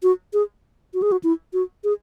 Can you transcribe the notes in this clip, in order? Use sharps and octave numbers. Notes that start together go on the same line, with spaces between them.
F#4
G#4
F#4
G#4
F#4
E4
F#4
G#4